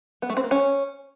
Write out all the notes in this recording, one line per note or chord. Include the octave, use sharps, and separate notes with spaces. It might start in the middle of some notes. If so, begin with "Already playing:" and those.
B3
A3
C4
A#3
C#4